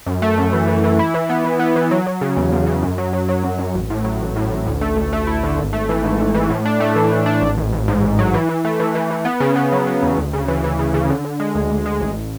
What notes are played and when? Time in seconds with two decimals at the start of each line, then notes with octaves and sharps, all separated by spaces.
0.06 F#2
0.22 A3
0.38 F#2
0.53 E3
0.68 E3
0.84 E3
0.99 E4
1.14 E3
1.29 B3
1.44 E3
1.59 B3
1.76 E3
1.91 F#3
2.07 F#3
2.21 C#3
2.37 E2
2.52 E2
2.67 C#3
2.83 F#2
2.98 F#3
3.13 F#3
3.29 F#3
3.43 F#2
3.58 F#2
3.74 A1
3.90 A2
4.04 F#3
4.21 A1
4.36 A2
4.51 A1
4.66 D2
4.81 A3
4.97 D2
5.13 A3
5.27 E4
5.43 D3
5.58 G#1
5.73 A3
5.89 E3
6.04 G#2
6.19 G#2
6.34 E3
6.50 A2
6.65 D4
6.80 A3
6.96 E3
7.12 E3
7.26 D4
7.41 A1
7.57 A1
7.73 A1
7.88 G#2
8.02 A1
8.19 F#3
8.34 E3
8.49 E3
8.65 A3
8.80 E3
8.95 E3
9.11 E3
9.25 B3
9.40 C#3
9.56 B3
9.72 F#3
9.87 B3
10.03 E2
10.17 D2
10.33 C#3
10.48 E3
10.64 E3
10.79 C#3
10.94 C#3
11.10 D3
11.25 D3
11.40 G#3
11.55 D2
11.71 D2
11.86 G#3
12.01 A1